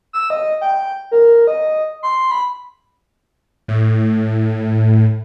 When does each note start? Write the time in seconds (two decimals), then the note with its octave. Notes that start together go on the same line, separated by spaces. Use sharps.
0.13 E6
0.30 D#5
0.61 G5
1.11 A#4
1.47 D#5
2.03 C6
2.31 B5
3.68 A2